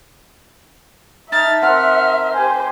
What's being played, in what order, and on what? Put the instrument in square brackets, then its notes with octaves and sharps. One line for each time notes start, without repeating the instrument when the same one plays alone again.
[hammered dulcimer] D#4 A5 [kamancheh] E5 [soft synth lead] F6 [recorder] A6
[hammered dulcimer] C4 A#4 [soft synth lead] F#5 [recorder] F6
[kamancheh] G4 C5 [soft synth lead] G#5